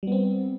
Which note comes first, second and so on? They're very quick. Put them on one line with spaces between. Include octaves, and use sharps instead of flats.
G3 B3 C4